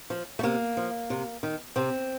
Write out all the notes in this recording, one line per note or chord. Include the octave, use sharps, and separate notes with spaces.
F3
A3
C3 A#3
F3
C3
D#3
C3 C4